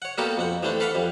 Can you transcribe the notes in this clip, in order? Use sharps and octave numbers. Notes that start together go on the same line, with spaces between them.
C#5 F#5
G3 A#3 B3 F#4 G4 A4
F2 C4 F#5
E3 G3 A3 C4 D4
A4 B4 F5 F#5 B5
F2 G3